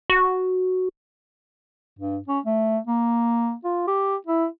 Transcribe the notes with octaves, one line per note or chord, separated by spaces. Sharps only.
F#4
G2
C#4
A3
A#3
F4
G4
E4